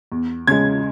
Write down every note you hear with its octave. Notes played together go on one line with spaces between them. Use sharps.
E2
C#3 G#3 G#6